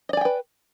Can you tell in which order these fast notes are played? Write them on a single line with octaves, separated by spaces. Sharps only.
D#5 D5 G#5 G5 B4